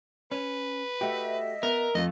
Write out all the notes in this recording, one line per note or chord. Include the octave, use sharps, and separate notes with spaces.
C#4 B4
A3 F#4 G4 D#5 E5
B3 A#4
F2 A3 F4 D#5